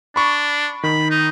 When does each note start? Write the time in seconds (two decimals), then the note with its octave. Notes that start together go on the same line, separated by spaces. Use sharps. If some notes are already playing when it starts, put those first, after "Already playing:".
0.16 D4 B5 C#6
0.83 D#3 B5
1.10 D#4